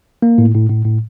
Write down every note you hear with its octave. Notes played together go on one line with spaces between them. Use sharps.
A#3
A2
A2
A2
A2